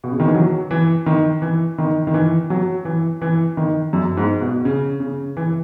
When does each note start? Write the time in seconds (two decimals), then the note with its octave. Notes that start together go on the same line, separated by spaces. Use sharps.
0.04 B2
0.12 C#3
0.20 D#3
0.26 E3
0.34 F#3
0.71 E3
1.06 D#3
1.42 E3
1.78 D#3
2.07 D#3
2.14 E3
2.50 F#3
2.85 E3
3.21 E3
3.57 D#3
3.93 F#2
4.17 G#2
4.41 B2
4.65 C#3
5.00 C#3
5.37 E3